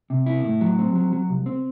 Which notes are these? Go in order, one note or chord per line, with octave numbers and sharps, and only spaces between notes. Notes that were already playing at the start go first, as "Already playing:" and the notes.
C3
E4
A2
F#3
C4
F#3
F#3
C2
C4